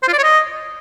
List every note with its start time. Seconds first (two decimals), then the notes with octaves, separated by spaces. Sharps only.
0.03 C5
0.08 F4
0.13 D5
0.18 C#5
0.23 D#5